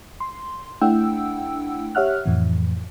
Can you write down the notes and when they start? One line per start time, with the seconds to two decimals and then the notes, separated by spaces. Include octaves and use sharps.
0.20 C6
0.81 A3 D4 E4 F#5 G5 E6
1.95 G4 C#5 E5 F#5 F6 F#6
2.25 F2 A2 E3